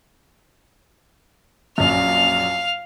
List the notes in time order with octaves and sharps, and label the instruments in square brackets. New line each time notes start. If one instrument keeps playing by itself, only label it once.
[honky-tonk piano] A#1 F#2 [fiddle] F5 F6